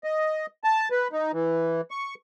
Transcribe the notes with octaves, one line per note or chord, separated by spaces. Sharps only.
D#5
A5
B4
D#4
E3
C#6